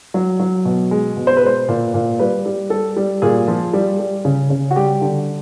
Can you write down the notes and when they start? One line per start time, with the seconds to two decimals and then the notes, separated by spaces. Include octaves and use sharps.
0.14 F#3
0.40 F#3
0.65 B2
0.91 G#3
1.17 B2
1.27 C5
1.37 B4
1.42 G#3 C5
1.68 A#2
1.94 A#2
2.19 G3 B4
2.45 G3
2.70 G3 A4
2.96 G3
3.22 A#2 G#4
3.48 F3
3.73 G3
3.99 G3
4.25 C#3
4.50 C#3
4.71 F#4
4.76 G3 G4
5.01 D3